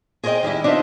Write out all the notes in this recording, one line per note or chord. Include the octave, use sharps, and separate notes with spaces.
G#4 A#4 C5 C#5 D#5 G5
D#3 G3 G#3 E4
D4 D#4 F4 A4 C5 E5